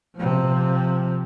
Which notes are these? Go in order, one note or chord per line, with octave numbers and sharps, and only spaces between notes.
C3 F3